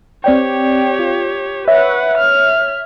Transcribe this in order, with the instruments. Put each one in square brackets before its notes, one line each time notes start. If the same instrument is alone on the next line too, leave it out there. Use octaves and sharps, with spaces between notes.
[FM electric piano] C4 D5 G5 [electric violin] G4 C#5
[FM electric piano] F4
[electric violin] B4 F#5 [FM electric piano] C#5 E5
[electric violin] F6